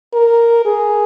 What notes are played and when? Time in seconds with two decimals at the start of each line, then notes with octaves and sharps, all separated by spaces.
0.14 A#4
0.66 G#4